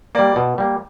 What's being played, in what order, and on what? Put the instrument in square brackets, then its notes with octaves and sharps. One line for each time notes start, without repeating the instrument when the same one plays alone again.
[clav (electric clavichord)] G3 A#3 [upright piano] D5
[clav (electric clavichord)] B2
G3 A#3